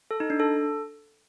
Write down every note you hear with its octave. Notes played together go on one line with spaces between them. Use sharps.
A4
D#4
D4
A4